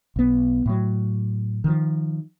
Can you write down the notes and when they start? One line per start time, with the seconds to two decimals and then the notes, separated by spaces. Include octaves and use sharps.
0.16 B1 B3
0.66 A2 F#3
1.64 D#3 F3